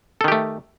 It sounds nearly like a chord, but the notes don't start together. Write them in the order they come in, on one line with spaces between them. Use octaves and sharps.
A4 D#3 G4 A3